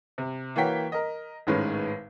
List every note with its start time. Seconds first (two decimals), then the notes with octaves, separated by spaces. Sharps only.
0.18 C3
0.56 E3 A#3 F#4 C#5 G5 B6
0.92 A#4 D#5
1.47 G#1 A2 D#3 G#3 C#4 B4